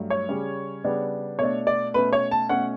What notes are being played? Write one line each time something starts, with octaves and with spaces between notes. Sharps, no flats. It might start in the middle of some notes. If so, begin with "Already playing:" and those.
Already playing: G2 F#3 A3
C#5
C#3 G3 C#4
C#3 G3 B3 D4
B2 A3 D4 C#5
D5
B2 A3 C#4 B4
C#5
A5
B2 A3 C#4 F#5